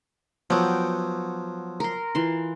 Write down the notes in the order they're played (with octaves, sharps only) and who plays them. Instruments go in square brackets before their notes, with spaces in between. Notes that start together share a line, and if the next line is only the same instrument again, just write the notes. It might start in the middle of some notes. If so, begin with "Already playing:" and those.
[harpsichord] F3 F#3 [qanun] B3 G5
[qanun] A#4 C6
E3 F4 C6